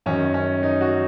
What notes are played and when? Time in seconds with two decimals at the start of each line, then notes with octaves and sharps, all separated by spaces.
0.06 F#2 D#3 F#3 C#4
0.34 C#4
0.63 D#4
0.81 F#4